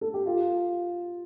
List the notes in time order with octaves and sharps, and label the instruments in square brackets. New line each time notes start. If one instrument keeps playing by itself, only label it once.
[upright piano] A4
G4
F4